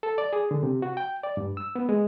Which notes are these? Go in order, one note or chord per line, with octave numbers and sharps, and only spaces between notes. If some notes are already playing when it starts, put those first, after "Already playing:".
A4
D5
G#4
D3
C3
F#4
G5
D5
G2
E6
B3
G#3